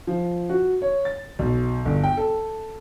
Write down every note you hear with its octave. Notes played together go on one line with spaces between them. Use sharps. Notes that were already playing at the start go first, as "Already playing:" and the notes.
F3
F#4
C#5
A6
B1
G1
G5
A4